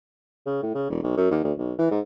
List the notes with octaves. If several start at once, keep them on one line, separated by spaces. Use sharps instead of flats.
C#3
A2
C#3
E1
B1
F#2
D#2
D2
B1
E3
G#2